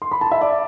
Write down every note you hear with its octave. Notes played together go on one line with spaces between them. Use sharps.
C6
B5
A5
E5
D5